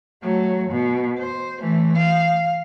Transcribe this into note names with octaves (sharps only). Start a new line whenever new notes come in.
F#3 A3
B2
C5
E3 A3
F5